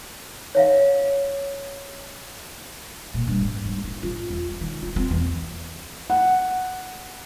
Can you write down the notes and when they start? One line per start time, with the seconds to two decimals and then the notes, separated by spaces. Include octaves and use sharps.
0.55 C#5 E5 F5
3.14 A#2
3.27 G2
3.41 G#2
3.65 G2
3.84 E4
4.03 F4
4.30 E2
4.47 G#3
4.61 D#3
4.82 F4
4.96 C4
5.11 E2
6.10 F#5